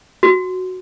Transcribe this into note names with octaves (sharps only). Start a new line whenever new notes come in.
F#4